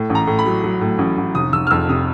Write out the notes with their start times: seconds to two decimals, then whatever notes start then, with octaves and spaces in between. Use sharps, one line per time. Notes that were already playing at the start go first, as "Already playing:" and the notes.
Already playing: A2
0.10 A1
0.15 A#5
0.27 A2
0.39 B5
0.45 F#3
0.64 F#3
0.81 A2
0.98 A1
1.18 A1
1.35 F1 D#6
1.53 F1 E6
1.67 F6
1.71 F2 E6
1.89 C3 D#6